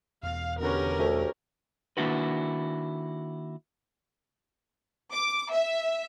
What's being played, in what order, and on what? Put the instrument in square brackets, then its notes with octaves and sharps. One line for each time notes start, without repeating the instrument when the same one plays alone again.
[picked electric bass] E1 E2 [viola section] F5
[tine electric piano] B2 D3 B4 [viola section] C#4 G4 A#4
[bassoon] D2 [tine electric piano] A3 A4 E5
[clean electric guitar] D#3 A#3 D4 E4 F#4 B4
[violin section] D6
E5